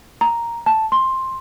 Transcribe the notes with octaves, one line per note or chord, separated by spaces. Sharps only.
A#5
A5
C6